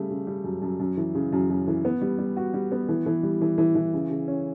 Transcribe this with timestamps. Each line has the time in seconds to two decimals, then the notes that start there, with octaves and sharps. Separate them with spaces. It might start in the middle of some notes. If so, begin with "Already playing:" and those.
Already playing: C#3 G3 A3
0.10 C#3
0.27 G3
0.44 F#2
0.62 F#2
0.80 F#2
0.97 E3
1.15 C#3
1.32 F#2
1.50 F#2
1.67 E3
1.85 B3
2.01 G3
2.18 G3
2.37 F#4
2.54 G3
2.72 B3
2.89 E3
3.06 E3
3.23 G3
3.41 E3
3.58 E3
3.75 E3
3.93 C#3
4.10 C#3
4.28 C#4